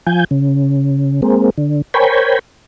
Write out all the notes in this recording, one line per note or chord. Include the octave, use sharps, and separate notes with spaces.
F3 G#5 G6
C#3
G#3 A#3 C4
D3
A#4 C5 C#5 G5 G#5 B5